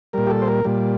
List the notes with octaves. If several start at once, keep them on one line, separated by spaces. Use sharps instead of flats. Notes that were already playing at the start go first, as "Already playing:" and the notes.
A#2 G3 A#4
G4
A4
C5
A#4
A#2 G3